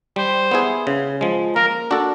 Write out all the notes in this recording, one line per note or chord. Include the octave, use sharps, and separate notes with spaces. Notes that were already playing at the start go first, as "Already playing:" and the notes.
G3 C5
B3 E4 G#4
C#3
F3 G#3
A#3 A#4
D4 F#4 A4